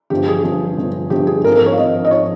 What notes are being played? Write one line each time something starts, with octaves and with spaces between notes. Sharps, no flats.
G1 G2 F3 G4
G#4
G1 G2 F3
G1 G2 F3
G1 G2 F3 G4
G#4
G#1 G#2 F3 A#4
A#4
C#5
F5
G#1 G#2 F3 D#5
D#5
G#2 F3 C#5